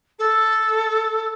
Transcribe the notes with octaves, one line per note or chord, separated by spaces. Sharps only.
A4